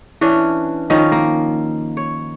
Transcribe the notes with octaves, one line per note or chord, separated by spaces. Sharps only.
E3 C#4 D4
D#3 F3 C#4 D#4
A#3
C#5